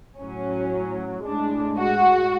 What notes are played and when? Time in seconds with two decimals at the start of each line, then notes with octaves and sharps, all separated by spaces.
0.18 A2 F#3 C#4
1.25 A2 G#3 D4
1.78 F#4